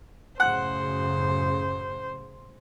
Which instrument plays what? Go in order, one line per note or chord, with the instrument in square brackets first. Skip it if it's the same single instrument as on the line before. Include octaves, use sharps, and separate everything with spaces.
[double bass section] F#2 A2 C#3 [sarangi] C5 [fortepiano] F#5